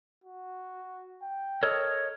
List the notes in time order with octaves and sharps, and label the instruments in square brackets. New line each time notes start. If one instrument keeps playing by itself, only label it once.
[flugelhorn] F#4
G5
[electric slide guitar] A4 A#4 C#5 [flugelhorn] D#5